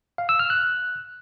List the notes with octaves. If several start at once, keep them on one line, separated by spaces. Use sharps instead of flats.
F5
E6
F6
F#6